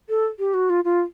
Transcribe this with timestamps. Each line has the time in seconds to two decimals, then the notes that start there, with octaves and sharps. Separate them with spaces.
0.09 A4
0.39 G4
0.54 F#4
0.70 F4
0.85 F4